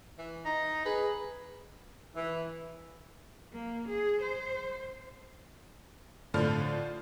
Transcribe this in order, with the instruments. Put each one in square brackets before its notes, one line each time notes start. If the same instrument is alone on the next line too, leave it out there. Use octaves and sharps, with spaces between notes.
[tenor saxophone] E3
[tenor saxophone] D#4 [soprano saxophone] A#5
[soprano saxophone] G#4 [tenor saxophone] B4
[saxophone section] E3
[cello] A#3
G#4
C5
[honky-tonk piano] A2 D3 F3 F6